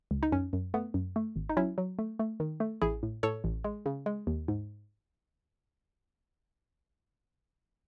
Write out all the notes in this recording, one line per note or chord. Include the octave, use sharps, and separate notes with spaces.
C#2
D#4
F#2 C#4
F#2
A3 B3
F#2
A3
G#1
D#4
F#3 C#4 E4
F#3
A3
A3
D#3
A3
A1 E4 G#4
A2
A2 A4 C#5
A1
G#3
C#3
G#3
D#2
G#2